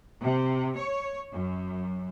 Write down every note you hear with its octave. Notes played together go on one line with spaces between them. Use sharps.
C3
C#5
F#2